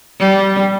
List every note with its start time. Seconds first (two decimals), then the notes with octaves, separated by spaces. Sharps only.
0.20 G3